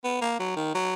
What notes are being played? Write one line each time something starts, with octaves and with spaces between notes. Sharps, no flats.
B3
A#3
F#3
D#3
F#3